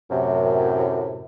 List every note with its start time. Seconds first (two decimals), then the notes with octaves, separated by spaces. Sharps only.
0.11 F#2 A2 C3